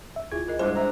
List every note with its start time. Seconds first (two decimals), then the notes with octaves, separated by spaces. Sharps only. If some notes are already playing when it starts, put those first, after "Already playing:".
0.16 E5
0.32 D2 E4 F4 G#4 G#6
0.47 F4 A#4 D#5
0.59 G#2 G3 G#3 D4 E4 C5 C6
0.76 E5 A#5